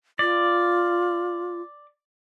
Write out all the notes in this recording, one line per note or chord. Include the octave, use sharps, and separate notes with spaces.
F4 D5